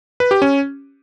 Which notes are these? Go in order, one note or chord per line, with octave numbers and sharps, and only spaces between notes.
B4
G4
C#4